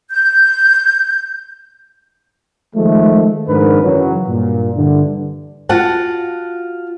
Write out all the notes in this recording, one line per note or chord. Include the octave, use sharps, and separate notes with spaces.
G6
D#3 F3 G#3 A3
F2 G#2 D#3 D4 A#4 B4
F#2 C#3 E3 F#3
G2 A#2
G2 D3 E3
F4 F#4 F#5 A5